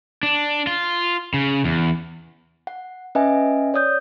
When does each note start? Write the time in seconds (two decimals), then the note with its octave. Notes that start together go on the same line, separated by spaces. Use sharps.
0.23 D4
0.67 F4
1.34 C#3
1.64 E2
2.67 F#5
3.15 C#4 B4 D#5 E5 G#5
3.74 C#5 D5 D#6 G6